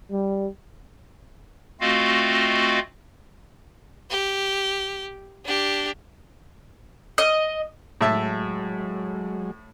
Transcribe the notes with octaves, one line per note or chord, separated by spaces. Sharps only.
G3
A3 C4 F4 F#4 D#5 F5
G4
D4 G4
D#5
A2 F#3 G#3 E5 A5